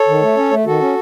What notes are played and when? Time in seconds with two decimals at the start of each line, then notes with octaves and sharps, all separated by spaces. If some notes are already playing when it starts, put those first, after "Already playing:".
Already playing: A4 C#5
0.08 D#3
0.22 A3
0.37 C#4
0.51 A3
0.66 D#3 F#4 A4
0.81 C#4